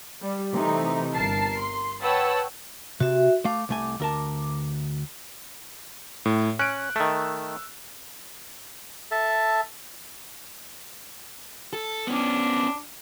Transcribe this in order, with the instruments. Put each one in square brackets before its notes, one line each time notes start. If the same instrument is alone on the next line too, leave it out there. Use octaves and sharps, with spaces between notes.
[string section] G3
C3 E3 A3 D#4
G1 A#4 A5 C7
C6
B4 C#5 F#5 G5 A5 E6
[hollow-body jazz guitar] C3 [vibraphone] F#4 E5
[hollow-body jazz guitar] A3 F5 [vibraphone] D6
[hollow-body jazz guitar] C2 A3 G#5
D2 A#4 A5
[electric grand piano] A2
[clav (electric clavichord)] C#4 [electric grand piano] F#6 D7
[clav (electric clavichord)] D#3 A3 [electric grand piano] E6
[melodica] A4 E5 A5
[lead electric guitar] A4
[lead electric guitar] B3 C#4 [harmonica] D4